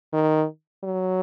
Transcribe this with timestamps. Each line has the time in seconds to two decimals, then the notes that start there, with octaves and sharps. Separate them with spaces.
0.13 D#3
0.84 F#3